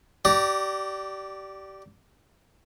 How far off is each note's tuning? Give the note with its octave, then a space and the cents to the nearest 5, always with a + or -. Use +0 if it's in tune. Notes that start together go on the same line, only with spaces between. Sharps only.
G4 -25 D5 +0 A#5 -5